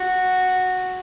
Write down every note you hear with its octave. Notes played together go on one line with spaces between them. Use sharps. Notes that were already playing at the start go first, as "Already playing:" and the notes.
Already playing: F#4